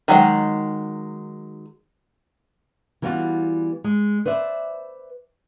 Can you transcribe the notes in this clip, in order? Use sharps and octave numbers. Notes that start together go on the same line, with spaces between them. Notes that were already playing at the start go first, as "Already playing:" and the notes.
D#3 F#3 G#3
E3 G3 B3 D#4 F4 F#4
G#3
B4 C5 D5 E5